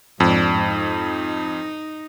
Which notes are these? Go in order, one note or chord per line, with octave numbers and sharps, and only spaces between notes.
F2 G#2 D4
D#4